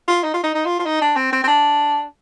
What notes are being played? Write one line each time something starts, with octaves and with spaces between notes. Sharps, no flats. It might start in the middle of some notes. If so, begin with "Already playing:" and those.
F4
D#4
F4
D#4
D#4
F4
F4
D#4
D4
C4
C4
C4
D4